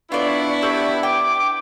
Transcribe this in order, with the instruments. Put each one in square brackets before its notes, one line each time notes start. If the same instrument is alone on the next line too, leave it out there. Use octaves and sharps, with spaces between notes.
[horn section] B3 D4 E4 [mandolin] F4 D5 [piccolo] C#6
[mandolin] G4 B4 E6
[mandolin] G5 [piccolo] D6